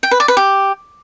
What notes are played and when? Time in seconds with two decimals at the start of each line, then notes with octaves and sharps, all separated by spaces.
0.03 G5
0.11 B4
0.20 D5
0.28 B4
0.37 G4